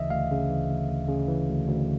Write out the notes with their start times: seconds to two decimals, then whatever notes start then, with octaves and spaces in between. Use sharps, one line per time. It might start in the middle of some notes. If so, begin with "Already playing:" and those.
Already playing: D2 C#3 E3 D#5 E5
0.10 D2 F5
0.31 C#3
0.50 E3
0.70 D2
0.89 D2
1.08 C#3
1.28 E3
1.48 D2
1.68 D2